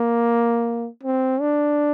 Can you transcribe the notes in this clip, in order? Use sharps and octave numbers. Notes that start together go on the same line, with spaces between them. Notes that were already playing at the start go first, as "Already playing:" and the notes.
Already playing: A#3
C4
D4